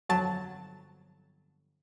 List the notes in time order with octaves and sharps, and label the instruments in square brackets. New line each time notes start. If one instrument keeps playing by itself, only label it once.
[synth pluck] G1 F2 F#3 A5 A6